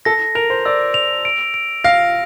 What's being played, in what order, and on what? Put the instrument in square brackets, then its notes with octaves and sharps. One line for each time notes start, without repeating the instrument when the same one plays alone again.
[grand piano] A4 [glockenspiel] A#6
[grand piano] A#4 [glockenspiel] F7
[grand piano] C5
[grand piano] D5 [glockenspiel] E6
[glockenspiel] F7
D7
D7
[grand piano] F5 [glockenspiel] A#6